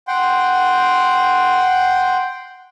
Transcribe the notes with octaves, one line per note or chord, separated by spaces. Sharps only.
F#5 G5 C6